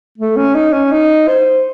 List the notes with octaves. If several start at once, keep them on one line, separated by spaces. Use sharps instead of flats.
A3
C#4
D#4
C#4
D#4
C5